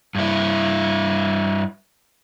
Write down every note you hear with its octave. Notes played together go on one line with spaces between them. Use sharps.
G2 E4